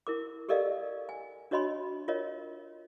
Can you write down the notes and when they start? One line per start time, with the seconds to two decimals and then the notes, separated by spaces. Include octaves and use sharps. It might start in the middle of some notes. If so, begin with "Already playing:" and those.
0.07 E4 A#4 D6
0.49 G4 A4 A#4 D5 D#5 F5
1.09 G#5
1.51 D4 F#4 C#5 D#5 B5 C6
2.08 F4 A#4 C#5 D#5